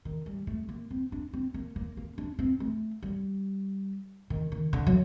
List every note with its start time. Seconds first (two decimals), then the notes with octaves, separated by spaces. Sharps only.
0.05 D#3
0.26 G3
0.47 A3
0.69 A#3
0.91 C4
1.12 D4
1.33 C4
1.54 A#3
1.76 A#3
1.97 A#3
2.18 D4
2.39 C4
2.60 A3
3.03 G3
4.30 D#3
4.52 D#3
4.73 D3
4.87 F#3